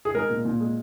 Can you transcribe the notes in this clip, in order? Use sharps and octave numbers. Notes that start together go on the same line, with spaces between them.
G#4
G#3 A#4
A#2
A#2
G#3